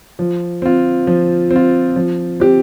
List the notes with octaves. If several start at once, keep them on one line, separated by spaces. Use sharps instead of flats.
F3
C4 F4
F3
C4
F4
F3
C4 G4